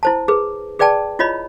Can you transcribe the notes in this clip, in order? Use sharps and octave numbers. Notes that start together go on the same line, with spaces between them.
E4 C5 A5
G#4 B4
G#4 B4 D5 G5 A5
E4 F4 C#5 D#5 B5